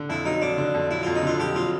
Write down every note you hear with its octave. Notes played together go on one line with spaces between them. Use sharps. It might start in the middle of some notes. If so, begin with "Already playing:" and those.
Already playing: D3
F2 E4
F#3 D#4
F2 D4
D3
F2
F#3 E4
F2 F4
D#4
D3 F4
F2 G4
F#3 F4